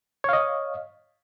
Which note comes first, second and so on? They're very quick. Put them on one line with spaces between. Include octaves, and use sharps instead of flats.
C#5 F5 D#5